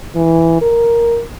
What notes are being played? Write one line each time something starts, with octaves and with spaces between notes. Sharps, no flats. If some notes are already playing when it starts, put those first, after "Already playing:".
E3
A#4